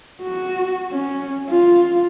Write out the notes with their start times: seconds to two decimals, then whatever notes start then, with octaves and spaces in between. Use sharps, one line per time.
0.22 F#4
0.92 C#4
1.51 F4